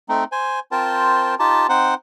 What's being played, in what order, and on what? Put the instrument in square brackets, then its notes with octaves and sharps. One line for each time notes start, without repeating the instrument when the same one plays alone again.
[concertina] A3 C4 D#4
C5 G#5
C4 F4 A#4 C5 G5 A5
D#4 F4 G4 A5
C4 D#4 C5 F#5